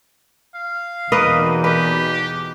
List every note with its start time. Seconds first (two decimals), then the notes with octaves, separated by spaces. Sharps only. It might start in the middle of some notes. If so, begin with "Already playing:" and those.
0.54 F5
1.12 E2 B2 A#3 D#4 B4 D#5
1.64 G4 B4